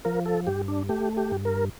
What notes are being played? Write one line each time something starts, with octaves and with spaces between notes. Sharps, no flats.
F3 A#4
A4
G2 G4
D4
A3 G4
G4
G2
A#4